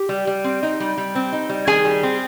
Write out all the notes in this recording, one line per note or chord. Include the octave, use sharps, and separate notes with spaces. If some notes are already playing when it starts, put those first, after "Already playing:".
Already playing: G4
G3
G3
C4
D#4
G3
G3
C4
D#4
G3
D#3 G#4 G#5
G3
C4